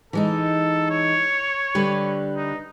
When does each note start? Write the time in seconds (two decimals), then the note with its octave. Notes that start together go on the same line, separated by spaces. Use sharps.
0.13 E3 G#3 D#4 A4
0.91 C#5
1.75 D3 G3 B4
2.36 D#4